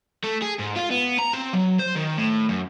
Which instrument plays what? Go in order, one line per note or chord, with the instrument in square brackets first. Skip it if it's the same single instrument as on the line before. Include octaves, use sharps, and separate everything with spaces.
[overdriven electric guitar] A3
G#4
G#2
F4
B3
A#5
C4
F#3
C5
D#3
A2
F#2